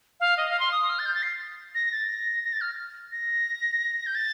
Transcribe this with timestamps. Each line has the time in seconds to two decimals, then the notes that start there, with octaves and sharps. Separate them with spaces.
0.20 F5
0.37 D#5
0.49 F5
0.60 C6
0.72 D#6
0.89 F6
0.99 A6
1.06 G6
1.14 A6
1.23 C7
1.75 A#6
1.92 A6
2.09 A#6
2.44 A#6
2.53 A6
2.61 F6
3.12 A#6
4.06 G6
4.15 A6